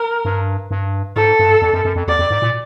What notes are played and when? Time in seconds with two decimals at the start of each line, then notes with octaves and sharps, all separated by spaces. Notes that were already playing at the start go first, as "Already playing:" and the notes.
Already playing: A#4
0.25 G2
0.71 G2
1.16 G#2 A4
1.39 G2
1.62 F2
1.73 F#2
1.85 F#2
1.95 F2
2.08 E2 D5
2.19 F2
2.30 G#2
2.42 A#2